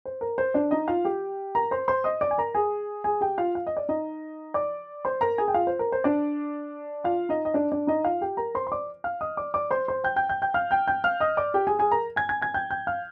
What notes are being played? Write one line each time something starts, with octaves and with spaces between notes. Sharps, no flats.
C5
A#4
C5
D4 D5
D#4 D#5
F4 F5
G4 G5
A#4 A#5
C5 C6
C5 C6
D#5 D#6
D5 D6
G#5
A#4 A#5
G#4 G#5
G#4 G#5
G4 G5
F4 F5
F5
D#5
D5
D#4 D#5
D5 D6
C5 C6
A#4 A#5
G#4 G#5
G5
F4 F5
C5
A#4
C5
D4 D5
F4 F5
D#4 D#5
D#5
D4 D5
D4 D5
D#4 D#5
F4 F5
G4 G5
A#4 A#5
C5 C6
C6
D5 D6
F5 F6
D#5 D#6
D5 D6
D5 D6
C5 C6
C5 C6
G5 G6
G5 G6
G5 G6
G5 G6
F5 F6
G5 G6
G5 G6
F5 F6
D#5 D#6
D5 D6
G4 G5
G#4 G#5
G#4 G#5
A#4 A#5
G#5 G#6
G#5 G#6
G#5 G#6
G5 G6
G5 G6
F5 F6